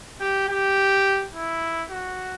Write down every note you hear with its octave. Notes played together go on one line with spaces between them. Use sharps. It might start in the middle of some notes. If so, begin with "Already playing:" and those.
G4
G4
E4
F#4